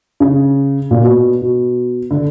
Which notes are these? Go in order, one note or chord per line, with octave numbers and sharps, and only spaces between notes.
C#3
A#2
B2
B2
D3